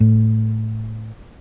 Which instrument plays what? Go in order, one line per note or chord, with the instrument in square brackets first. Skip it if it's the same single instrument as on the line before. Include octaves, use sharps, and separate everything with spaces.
[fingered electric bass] A2